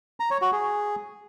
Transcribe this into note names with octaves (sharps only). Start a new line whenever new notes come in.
A#5
C#5
F#4
G#4